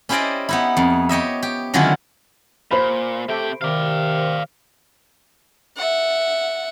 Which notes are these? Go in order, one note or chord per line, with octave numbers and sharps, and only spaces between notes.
C#4 E4 G4 C5 D5 D#5
B3 D#4 E4
F2
G4 C#5 D#5 E5
G4
D3 D#3 F#3 C#4 E4 F4
A#2 C5 B5
C3 A3 G4 G5
C3 D#3 D5 F5
E5 F#5